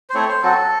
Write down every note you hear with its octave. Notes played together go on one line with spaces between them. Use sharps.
C5
A3 C4 E4 C#5
C5
F#3 C4 F#4 A4